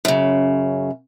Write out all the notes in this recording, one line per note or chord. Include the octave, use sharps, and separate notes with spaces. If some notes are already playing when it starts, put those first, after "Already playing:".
F#2 C#3